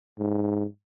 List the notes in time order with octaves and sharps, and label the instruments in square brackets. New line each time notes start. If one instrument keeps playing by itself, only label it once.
[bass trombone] G#2